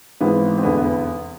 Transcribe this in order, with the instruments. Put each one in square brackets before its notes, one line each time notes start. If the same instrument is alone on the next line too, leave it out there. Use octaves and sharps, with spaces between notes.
[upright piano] G#1 G#2 E3 B3
C4
F1 E2 D3 B3
B3